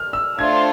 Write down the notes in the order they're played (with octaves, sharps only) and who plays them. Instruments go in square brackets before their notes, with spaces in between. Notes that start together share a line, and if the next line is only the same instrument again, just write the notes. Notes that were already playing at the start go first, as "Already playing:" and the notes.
Already playing: [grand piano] F6
E6
[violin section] A3 D4 F4 A4 C5 [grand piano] G#6